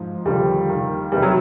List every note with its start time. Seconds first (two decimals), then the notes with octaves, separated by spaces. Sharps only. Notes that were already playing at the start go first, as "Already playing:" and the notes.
Already playing: G#2 F3
0.25 D#2 D3 F3 G3
0.69 D#2 D#3
1.12 E2 C3 D#3 G3
1.23 F#3